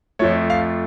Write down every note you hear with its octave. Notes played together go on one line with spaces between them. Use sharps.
F2 F3 A3 C#5
F5